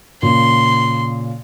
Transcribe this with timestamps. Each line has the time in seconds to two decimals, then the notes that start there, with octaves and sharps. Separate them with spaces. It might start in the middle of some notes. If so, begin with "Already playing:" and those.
0.22 A#2 C#3 C6